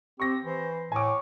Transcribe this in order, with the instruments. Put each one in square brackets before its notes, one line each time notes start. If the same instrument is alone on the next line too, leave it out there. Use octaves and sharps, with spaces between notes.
[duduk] C4 [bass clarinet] G4 [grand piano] C#6 A#6
[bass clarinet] E3 [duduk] C5
[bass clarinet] A2 [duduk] C#5 [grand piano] G#5 D6